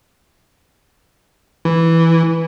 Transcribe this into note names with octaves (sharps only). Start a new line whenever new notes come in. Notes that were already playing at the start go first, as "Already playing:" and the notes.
E3